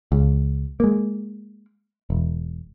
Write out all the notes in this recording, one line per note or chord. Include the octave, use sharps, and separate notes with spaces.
C#2
G#3 A#3
E1